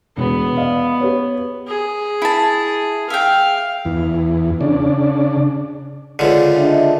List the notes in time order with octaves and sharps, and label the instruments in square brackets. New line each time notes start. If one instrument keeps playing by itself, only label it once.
[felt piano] E1 [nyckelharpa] B3
[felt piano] D5 D#5 F5
G4 B4 C#5
[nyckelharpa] G#4
[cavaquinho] E4 A5
[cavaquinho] E5 G5 [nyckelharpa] F5
[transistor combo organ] E2
C#3 D4
[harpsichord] C#2 D3
[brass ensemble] D4 D#5 E5